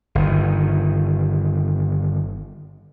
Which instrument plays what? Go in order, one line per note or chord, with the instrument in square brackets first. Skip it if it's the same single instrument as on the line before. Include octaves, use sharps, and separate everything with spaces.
[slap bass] G1 D#3